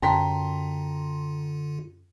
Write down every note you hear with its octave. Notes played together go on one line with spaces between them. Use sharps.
F#2 D3 F4 G5 A5 A#5 C6 B6